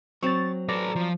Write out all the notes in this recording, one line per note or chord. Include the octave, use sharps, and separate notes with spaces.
F#3 C4 C#6 A6
A4 B4 D5 A#5
F3